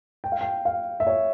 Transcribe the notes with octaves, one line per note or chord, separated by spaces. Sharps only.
G5
F5
G5
F5
E5
C#5